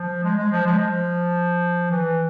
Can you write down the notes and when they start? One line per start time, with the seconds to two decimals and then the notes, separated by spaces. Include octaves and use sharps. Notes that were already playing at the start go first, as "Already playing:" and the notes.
Already playing: F3
0.23 G#3
0.38 G#3
0.51 F3
0.66 G#3
0.79 F3
1.91 E3